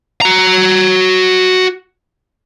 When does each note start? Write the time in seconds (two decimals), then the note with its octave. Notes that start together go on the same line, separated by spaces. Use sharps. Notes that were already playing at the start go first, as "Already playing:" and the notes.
0.21 F#4 A#5